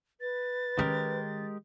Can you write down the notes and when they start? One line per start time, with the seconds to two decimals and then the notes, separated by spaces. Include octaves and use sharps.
0.21 B4 A6
0.79 D#3 G#3 C#4 G4 A#4